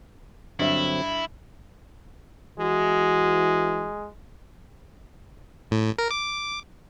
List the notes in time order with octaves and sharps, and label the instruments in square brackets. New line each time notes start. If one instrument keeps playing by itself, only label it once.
[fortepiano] G2 E5 [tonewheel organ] D3 F#3 C4 [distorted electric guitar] E4
[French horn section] E3 F#4 [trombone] G#3
[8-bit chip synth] A2
A#4
D6